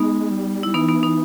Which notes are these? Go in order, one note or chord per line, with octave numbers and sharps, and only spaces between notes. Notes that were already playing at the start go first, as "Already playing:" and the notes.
Already playing: G#3 B3 D#4
G3
G3 E4
E3 B3 D#4
B3 D#4
B3 D#4